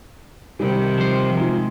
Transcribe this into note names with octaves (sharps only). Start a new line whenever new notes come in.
C3 D#3 G3 A#4
F3 C5
G#3 D#4 F4